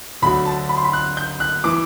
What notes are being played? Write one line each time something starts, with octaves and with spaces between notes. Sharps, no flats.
D2 D3 F#3 B5
A5
B5
C6
B5
F#6
G6
F#6
E3 D6